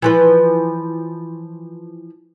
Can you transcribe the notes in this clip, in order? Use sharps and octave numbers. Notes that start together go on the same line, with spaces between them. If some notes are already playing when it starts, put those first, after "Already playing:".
E3 F3 B4